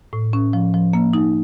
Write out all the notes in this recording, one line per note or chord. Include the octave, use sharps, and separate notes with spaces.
A2
C#4
F3
F3
A#3
D#4